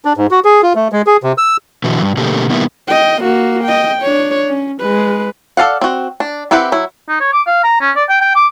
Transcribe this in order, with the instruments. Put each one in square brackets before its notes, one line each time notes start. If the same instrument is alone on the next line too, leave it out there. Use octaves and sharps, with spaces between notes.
[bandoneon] D4
G#2
F#4
G#4
F4
A3
G#3
G#4
C3
E6
[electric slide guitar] B2 D3 E3 F#3
G2
B2 D3 A3 A#3 G4
B2 D#3 G3 A#3 B3 E4
[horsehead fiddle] D#5 G5
A#3 F#4
D#5 G5
D4 C#5
C#4
G#3 B4
[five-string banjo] A4 D5 F5 F#5
C4 F#4
D4
C4 E4 G4 B4 F#5
F#3 E4
[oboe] D#4
C#5
D6
F5
A#5
C#4
D5
G5
G5
D6